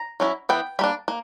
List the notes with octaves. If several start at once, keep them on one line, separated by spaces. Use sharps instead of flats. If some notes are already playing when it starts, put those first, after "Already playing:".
Already playing: A#5
F#3 C#4 E4
E3 B3 E4 G5
G3 A#3 D4 B5
A#3